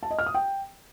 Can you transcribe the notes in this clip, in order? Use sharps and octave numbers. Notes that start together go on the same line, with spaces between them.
A5
D#5
F6
D#6
G5